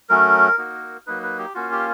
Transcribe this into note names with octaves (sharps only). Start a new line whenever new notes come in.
F#3 A3 C#4 A#4
A#3 D#4 F#4
F#3 A#3 D#4 B4
B4
G4
A#3 C#4 F4 F#4
G4